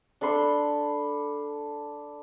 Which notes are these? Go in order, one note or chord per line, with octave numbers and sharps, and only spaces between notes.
D4 A4 B5 C6